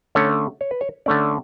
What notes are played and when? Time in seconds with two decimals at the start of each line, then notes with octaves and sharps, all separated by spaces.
0.15 D3 A3 C#4 C#5
0.61 C#5
0.71 B4
0.81 C#5
1.06 D3 A3 C#4 D5